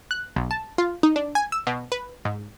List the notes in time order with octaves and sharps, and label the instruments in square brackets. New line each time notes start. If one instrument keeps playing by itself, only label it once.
[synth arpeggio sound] F#6
B1
A5
F4
D#4
D4
G#5
E6
B2
B4
G#2